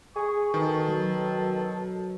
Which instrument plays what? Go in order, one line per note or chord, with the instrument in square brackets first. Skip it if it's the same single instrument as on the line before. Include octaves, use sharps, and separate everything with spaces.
[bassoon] G#4 [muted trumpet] C#6
[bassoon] B2 [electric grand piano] D#3 [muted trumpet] A4
[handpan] F#3